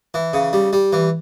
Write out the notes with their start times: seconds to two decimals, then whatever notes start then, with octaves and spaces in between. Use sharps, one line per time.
0.14 E3
0.33 C#3
0.53 G3
0.73 G3
0.93 E3